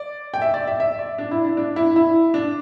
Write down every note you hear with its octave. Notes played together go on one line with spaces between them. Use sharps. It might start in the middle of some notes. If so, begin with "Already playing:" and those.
Already playing: D5
G5
E5
D5
E5
E5
D5
D4
E4
D4
D4
E4
E4
D4